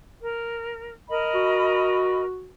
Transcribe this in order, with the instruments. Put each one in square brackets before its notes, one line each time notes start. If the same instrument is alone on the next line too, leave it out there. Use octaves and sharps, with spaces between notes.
[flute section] A#4
A#4 D#5 B5
[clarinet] F#4